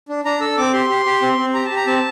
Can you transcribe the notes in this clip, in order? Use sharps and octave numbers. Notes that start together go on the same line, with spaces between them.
D4
D4 A#5
A4 E6
C4 D6
G4 C6
G4
G4
C4
C4
G4 A#5
A5
G4
A#5
C4 A5